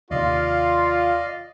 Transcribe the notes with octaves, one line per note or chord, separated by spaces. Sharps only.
D#2 C3 D#3 F4 D5 D#5 F5